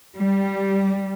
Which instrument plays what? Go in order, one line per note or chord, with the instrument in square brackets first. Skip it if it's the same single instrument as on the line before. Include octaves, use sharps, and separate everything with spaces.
[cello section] G3